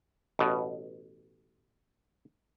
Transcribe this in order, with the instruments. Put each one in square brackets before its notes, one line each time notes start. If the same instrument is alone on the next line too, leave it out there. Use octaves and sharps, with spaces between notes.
[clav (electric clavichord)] A1 B2